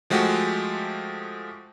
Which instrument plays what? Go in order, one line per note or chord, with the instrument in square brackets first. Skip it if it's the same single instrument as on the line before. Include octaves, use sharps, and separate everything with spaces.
[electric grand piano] F3 G#3 A3 F#4 G4